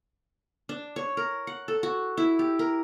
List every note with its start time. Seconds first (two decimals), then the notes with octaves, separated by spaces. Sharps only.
0.69 D4
0.96 C#5
1.17 A#4
1.47 F#5
1.68 A4
1.83 F#4
2.17 E4
2.39 G4
2.59 A#4